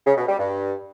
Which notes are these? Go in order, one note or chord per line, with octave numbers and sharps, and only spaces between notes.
C#3
B2
G3
G2